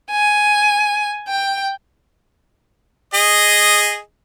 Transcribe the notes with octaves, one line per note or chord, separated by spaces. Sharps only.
G#5
G5
G#4 D#5